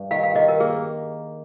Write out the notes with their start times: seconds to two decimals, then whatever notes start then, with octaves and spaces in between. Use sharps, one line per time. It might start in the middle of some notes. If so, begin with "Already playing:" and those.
Already playing: G2
0.11 D#3 F5
0.23 F5
0.35 D#3 D#5
0.48 A#4
0.60 A#3 G#4